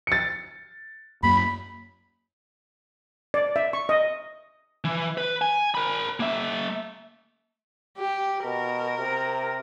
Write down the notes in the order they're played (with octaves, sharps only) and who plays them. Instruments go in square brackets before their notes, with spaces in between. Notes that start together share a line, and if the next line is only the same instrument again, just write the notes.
[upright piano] A6 C#7
[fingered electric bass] F#2 A#3 [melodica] B5
[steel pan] D5
E5
C#6
D#5
[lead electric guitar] E3
B4
G#5
A#4 B5
A#3 E5
[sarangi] G4
[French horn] B2 [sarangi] A#4
[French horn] C3